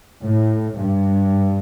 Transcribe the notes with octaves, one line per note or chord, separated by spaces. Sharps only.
A2
G2